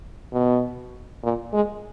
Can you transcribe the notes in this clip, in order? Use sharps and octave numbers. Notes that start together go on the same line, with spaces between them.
B2
A#2
G#3